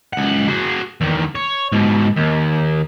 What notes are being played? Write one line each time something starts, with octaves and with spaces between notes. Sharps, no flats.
C#2 F#5
F#4 G#4
E2 D#3
C#5
G#2 B2
D#2